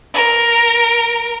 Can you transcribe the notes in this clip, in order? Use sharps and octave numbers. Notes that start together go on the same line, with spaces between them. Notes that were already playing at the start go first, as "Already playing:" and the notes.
A#4